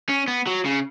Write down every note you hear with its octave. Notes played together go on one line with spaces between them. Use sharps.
C#4
B3
F#3
C#3